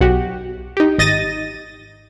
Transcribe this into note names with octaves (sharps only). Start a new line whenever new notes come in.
B1 F#4 G4
D#4 G4
G#1 D#5 A6 A#6 D#7